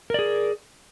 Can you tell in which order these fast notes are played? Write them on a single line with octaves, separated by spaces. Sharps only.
A#4 D5 G#4